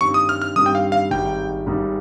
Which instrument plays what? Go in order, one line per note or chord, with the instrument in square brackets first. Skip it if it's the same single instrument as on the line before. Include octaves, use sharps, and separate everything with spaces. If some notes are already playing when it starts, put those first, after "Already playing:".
[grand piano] G2 D#3 G3 C4 [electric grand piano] C#6
[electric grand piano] D#6
F6
F6
[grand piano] G2 D#3 G3 C4 [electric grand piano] D#6
[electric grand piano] G5
F5
F5
[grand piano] G#1 G#2 D#3 G3 [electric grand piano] G5
[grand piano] G#1 G#2 D#3 G3